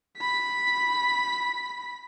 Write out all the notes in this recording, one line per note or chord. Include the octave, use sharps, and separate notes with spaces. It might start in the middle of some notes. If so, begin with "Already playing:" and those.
B5 B6